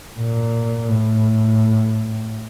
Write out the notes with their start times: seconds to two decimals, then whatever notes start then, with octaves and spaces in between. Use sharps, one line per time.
0.19 A#2
0.88 A2